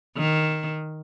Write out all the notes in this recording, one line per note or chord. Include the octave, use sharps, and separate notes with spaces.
D#3